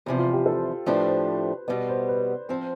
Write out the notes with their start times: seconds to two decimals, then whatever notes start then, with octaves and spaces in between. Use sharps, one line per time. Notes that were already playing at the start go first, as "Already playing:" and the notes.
0.06 E2 C3 F3 C5
0.19 F4
0.33 G4
0.46 A4
0.86 A2 F3 A3 D4 G4 B4
1.07 C5
1.68 B2 G3 B3 D5
1.89 C5
2.08 B4
2.49 F3 C4 C5